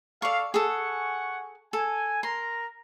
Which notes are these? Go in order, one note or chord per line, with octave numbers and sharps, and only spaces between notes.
A4 D5 F5 C#6
G#4 A4 F#5 G#5 C#6
A4 G#5
A#4 A#5 C6